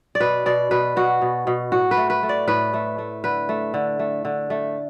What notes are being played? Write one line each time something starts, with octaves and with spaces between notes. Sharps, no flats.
D5
B2 B4
B2 D5
B2 B4
B2 F#4
B2
B2
A2 F#4
B4
A3
B4
A3
D5
A2 B4
A3
A3
D3 B4
A3
D3
A3
D3
A3